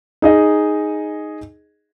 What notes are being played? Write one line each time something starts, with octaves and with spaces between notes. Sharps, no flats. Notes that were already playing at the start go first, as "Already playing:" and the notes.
D#4 G#4 D#5